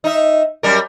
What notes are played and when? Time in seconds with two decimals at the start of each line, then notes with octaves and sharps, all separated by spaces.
0.04 D#4 E5
0.63 F#2 G3 A#4